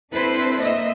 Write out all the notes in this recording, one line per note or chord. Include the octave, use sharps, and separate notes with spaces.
C4 D4 E4 A4 B4 C5
A#3 D#5 E5